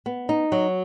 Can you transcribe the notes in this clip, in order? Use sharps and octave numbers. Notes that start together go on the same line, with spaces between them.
B3
D#4
F#3